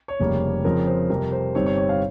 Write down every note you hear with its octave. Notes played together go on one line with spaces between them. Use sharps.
C#5
F1 F2 C#3 G3 A#3
F2 C#3 F3 C4 A#4
C5
F2 C3 G3 A#4
C5
G1 G2 G3 C4 D#4 C#5
C#5
C#5
F5